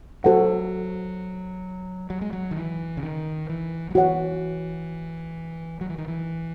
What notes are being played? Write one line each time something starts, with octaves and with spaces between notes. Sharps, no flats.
F#3 F#4 A4 C5 F#5
F#3
G#3
F#3
D#3
E3
C#3
D#3
E3
F#3
E3 F#4 C#5 F#5
F#3
E3
D#3
E3